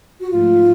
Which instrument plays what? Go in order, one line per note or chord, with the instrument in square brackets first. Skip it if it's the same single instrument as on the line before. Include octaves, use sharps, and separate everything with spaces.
[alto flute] F#4
[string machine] G#2 F3 A3 [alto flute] F4